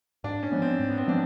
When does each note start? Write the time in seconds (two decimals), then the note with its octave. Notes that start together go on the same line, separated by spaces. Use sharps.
0.24 G#2 D4
0.43 C#4
0.52 F3 G#3 B3
0.62 C4
0.79 G#2
0.90 B3
0.98 C4
1.07 F3 G#3 B3 D4